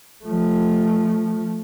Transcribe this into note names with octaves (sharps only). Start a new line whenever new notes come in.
F3 A3